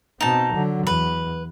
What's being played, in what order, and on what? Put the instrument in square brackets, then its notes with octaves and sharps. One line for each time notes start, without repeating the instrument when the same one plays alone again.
[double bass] B2 C4 [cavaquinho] D#4 A5
[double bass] D3 F#3
[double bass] E2 [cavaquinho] B4